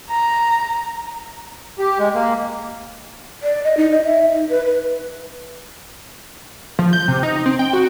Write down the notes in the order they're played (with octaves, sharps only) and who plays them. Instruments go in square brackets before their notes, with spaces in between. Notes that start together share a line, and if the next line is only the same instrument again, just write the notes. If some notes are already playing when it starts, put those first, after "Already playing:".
[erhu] A#5
[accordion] G4
G#3
A#3
[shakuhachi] D5
D#5
D#4
D#5
E5
D#4
B4
B4
[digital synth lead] F3
G6
C3
D#4
C4
G5
F#4